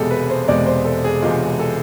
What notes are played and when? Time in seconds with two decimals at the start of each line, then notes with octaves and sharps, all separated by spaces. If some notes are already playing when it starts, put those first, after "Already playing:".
Already playing: E1 E2 C3 G#3 G#4 A4
0.11 B4
0.30 C5
0.48 E1 E2 C3 G#3 D5
0.66 C5
0.85 A4
1.04 G#4
1.22 E1 E2 C3 G#3 F4
1.60 A4